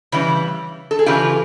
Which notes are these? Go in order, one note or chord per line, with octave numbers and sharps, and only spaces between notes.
C#3 E3 G3
A4
G#4
C#3 E3 F4 G4